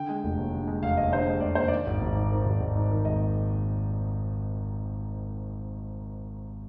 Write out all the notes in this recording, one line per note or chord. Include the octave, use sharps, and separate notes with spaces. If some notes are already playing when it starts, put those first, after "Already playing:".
Already playing: D3 G5
G#3
F1
D#2
D3
G#3
F1 F5
D#2 D#5
D3 C5
G#3 D#5
F1 D5
D#2 C5
D#3 D5
G#1
G#1
G#2
D#3
G#1
G#1
G#2
D#3
G#1 D#5